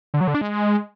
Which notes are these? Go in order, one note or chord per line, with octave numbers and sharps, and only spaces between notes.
D3
F#3
D3
D4
G#3